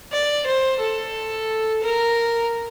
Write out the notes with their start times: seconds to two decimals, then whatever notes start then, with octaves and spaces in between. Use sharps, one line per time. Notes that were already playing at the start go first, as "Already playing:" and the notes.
0.13 D5
0.46 C5
0.80 A4
1.83 A#4